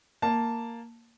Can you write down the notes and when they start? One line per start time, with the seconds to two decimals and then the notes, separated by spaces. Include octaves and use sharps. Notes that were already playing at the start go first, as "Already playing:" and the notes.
0.22 A#3 A5